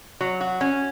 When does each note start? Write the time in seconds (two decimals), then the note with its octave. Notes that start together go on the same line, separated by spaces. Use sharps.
0.21 F#3
0.41 F#4
0.61 C#4